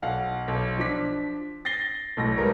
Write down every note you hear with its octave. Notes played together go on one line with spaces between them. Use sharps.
B1 F5 F#5
B1
F3 D4 B6
A6 A#6 C7 G7
B1 A2 A#6
C#2 G3 A#4 B4 C#5